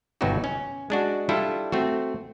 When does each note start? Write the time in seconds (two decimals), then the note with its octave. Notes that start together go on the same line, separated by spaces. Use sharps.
0.21 G1 B2 F#3 D#4 F#4 G4
0.44 C#4
0.90 G#3 D4 F#4
1.29 G3 D4 E4 F4 A4
1.72 A3 C4 F#4